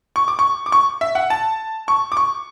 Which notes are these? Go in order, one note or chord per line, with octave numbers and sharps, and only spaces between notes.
C#6
D6
C#6
D6
C#6
E5
F#5
A5
C#6
D6
C#6